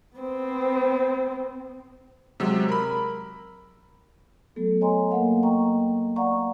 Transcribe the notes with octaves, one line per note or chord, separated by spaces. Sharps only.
B3 C4
C3 F#3 G#3 E6
A#4 B5
F#3 A3 B3 A4
C#5 D#5 G#5 A#5 C6
A#3 B3 A#4 F5 F#5
D#5 G5 A#5 C#6
D5 F5 F#5 A#5 C#6